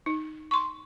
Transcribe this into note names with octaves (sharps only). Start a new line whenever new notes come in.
D#4
C6 C#6